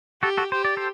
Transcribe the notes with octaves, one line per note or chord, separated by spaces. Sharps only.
F#4 G4 A4
F#4 A4
G4 C5
D5
A4 C5